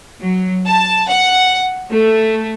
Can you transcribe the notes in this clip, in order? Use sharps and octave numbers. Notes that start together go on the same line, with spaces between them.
F#3
A5
F#5
A3